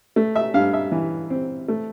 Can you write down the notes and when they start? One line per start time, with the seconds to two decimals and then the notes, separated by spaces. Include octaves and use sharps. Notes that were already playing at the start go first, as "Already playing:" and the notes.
0.16 A3
0.35 E5
0.54 G2 F5
0.73 E5
0.92 E3
1.30 C4
1.68 A3